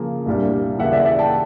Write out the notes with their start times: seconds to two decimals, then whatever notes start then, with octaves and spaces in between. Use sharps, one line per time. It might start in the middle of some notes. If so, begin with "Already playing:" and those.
Already playing: C#3 F3 A#3
0.26 C2 A#2 G3 A#3 D4
0.79 D#2 C#3 E3 E5 F#5
0.92 D5 E5
1.05 D5 E5
1.19 G5 A5